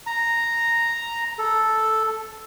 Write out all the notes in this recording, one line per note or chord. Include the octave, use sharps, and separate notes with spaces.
A#5
A4